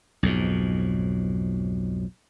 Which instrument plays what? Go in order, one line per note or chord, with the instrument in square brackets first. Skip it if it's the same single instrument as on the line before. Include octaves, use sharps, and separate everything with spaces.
[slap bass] B1 F2 G#2